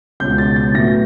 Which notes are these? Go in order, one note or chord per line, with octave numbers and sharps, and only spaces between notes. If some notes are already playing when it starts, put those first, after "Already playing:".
C#2 B2 G#3 C#4 F4 G6
A6
A6
A2 F#3 B3 A#6